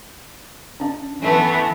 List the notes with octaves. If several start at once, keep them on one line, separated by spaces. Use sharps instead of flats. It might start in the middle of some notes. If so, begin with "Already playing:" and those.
C#4 D4
E3 A3 B3